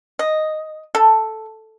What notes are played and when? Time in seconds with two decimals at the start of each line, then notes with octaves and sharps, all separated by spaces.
0.19 D#5
0.95 A4